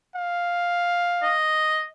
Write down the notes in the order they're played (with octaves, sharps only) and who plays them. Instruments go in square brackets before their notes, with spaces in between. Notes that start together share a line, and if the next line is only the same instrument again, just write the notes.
[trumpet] F5
[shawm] D#5